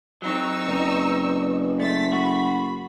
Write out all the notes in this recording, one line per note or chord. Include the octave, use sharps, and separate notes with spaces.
F#3 C4 D#4 C#6 E6
F#1 B4 D5 D#5
A3 C6 A6 B6
F#4 B5